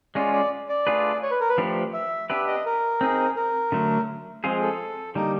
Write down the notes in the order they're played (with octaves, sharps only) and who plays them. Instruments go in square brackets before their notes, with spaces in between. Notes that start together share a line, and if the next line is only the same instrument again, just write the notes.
[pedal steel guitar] G#3 C#4 F4 [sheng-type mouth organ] D5
[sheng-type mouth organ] D5
D5
[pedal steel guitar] A3 D4 F4 G#4 B4
[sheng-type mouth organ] C#5
B4
A#4
B4
[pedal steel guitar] F3 A3 D4 G4
[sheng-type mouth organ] E5
[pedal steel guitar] B3 D4 G4 B4 [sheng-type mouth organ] E5
[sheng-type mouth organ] D#5
A#4
[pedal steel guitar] C4 D#4 G#4
[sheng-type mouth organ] A#4
[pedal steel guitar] D3 F#3 A3
F3 G#3 C4 F4 G#4
[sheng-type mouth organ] A4
[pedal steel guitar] D3 G3 A#3 [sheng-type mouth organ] D#4